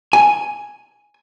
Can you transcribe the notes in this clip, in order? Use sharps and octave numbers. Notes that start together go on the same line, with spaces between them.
G#5